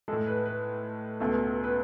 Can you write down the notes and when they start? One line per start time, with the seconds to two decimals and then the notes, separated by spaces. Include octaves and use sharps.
0.08 G#3 A4
0.13 A2
0.27 B4
0.45 B4
1.20 C#2 B2 A3
1.64 B4